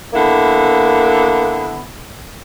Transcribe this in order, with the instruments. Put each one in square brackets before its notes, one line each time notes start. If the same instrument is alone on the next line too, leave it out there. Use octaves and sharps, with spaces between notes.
[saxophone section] D3 B3 E4 [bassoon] A#3